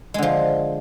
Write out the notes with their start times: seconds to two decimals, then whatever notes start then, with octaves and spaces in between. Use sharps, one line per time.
0.14 G#3
0.18 D3
0.23 F3